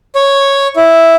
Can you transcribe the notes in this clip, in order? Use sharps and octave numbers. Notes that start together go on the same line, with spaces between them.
C#5
E4